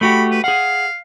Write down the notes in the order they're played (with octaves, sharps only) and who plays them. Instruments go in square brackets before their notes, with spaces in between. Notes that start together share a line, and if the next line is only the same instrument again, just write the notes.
[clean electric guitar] A3 F#4 G4 [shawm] B5
[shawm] B4
[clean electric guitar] G#4 F#5 [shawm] F5